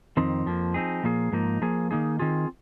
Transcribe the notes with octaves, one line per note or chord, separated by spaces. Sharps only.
F2 D#3 C4 D#4
F2 F3 A#3
F3 C4 D#4 G#4
A#2 F3 A#3 G#4
G#2 F3 A#3 D#4
F3 A#3 G#4
D#3 A#3 D#4 G#4
D#3 C4 F4 G#4